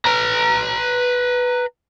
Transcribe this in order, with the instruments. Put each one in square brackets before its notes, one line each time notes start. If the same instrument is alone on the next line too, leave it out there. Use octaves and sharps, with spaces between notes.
[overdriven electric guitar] B4 A#5